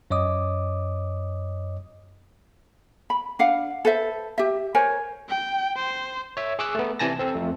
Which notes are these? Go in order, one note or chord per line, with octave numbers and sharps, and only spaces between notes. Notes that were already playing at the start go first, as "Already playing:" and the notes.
F#2 C#5 D#5 D6 D#6
B5
D4 F5 F#5
A4 B4 C5 E5
G4 E5
A#4 C5 C#5 G#5
G5
C5
C#5 E5
G#4 C#6 D6 E6 F#6
A3 B3
C3 E3 G#5 A5 A#6
C4 A4
F2 A3